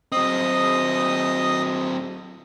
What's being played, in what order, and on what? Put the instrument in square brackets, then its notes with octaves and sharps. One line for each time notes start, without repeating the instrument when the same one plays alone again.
[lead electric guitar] F#3 C4 [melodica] D#5 D#6